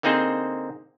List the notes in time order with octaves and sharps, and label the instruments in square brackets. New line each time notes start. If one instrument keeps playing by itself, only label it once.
[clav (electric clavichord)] D3 A#3 C4 D#4 G#4 C5